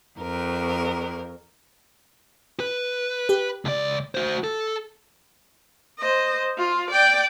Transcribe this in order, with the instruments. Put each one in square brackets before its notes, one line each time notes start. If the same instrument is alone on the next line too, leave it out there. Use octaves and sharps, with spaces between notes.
[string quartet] F2 A#4
[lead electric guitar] B4
[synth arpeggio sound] G4
[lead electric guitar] C#2 D5
F#4 C5
A4
[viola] C5 D#5
F4
D5 G5